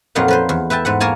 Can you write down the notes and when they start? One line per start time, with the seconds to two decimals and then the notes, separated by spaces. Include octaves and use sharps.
0.15 F2 A#2 F#3 D#4 B4 F5
0.28 F3 B4 C5
0.49 E2
0.70 B4 E5 G5 A5
0.85 G#2 B4 F#5
1.00 A#3 A#4 C#5 G#5 A5